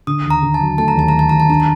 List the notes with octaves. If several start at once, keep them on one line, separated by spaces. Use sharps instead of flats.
D3 D#6
D#2
A#5
D3
A5
F#3
A3 A5
A#5
D#2 A5
A#5
D#2
A5
D#2 A#5
A5
D4 A#5
A5